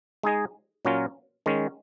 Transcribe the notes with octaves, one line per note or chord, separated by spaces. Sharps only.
G#3 D#4 G#4 D#5
A#2 F#3 C#4 F4 A#4
D#3 G#3 C#4